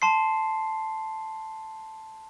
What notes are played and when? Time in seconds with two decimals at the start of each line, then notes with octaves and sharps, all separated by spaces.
0.02 A5 C6 C7